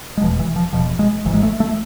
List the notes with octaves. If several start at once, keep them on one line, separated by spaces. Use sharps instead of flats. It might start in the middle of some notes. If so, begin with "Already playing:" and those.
G#3
F1 E2 B2 F3
E3
F3
E1 E2 B2 F3
G#3
G#1 G#2 E3
G#3
A3
A3